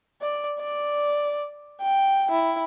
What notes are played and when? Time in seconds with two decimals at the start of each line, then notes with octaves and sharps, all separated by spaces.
0.21 D5
0.60 D5
1.81 G5
2.31 E4